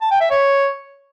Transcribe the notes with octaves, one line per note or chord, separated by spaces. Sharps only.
A5
G5
E5
C#5